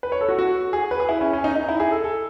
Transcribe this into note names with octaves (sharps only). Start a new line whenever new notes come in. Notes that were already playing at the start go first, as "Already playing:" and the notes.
B4
C#5
A4
F#4
F#4
G#4
B4
G#4
E4
C#4
C#4
D#4
D#4
E4
G#4
A4
A4